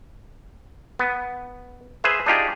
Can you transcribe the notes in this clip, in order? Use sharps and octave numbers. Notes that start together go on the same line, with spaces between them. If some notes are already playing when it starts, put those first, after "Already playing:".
B3
G#4 B4 C5 E5
D4 D#4 F4 G4 G#4